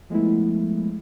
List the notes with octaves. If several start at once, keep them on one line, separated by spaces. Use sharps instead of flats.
F3 G#3 A3 B3 E4